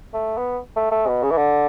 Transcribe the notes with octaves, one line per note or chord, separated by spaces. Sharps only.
A3
B3
A3
A3
B2
C#3
E3
D3